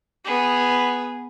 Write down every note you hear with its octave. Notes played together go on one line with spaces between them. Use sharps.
B3 G#4